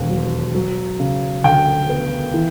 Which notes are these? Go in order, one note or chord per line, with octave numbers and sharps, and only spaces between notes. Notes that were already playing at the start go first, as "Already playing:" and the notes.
Already playing: E1 D#2
F#3
F#3
C#3
D2 G5
B3
E3